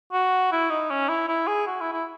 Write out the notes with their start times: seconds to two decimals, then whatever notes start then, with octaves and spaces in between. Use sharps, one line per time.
0.13 F#4
0.52 E4
0.70 D#4
0.90 C#4
1.09 E4
1.28 E4
1.47 G#4
1.67 F#4
1.80 E4
1.93 E4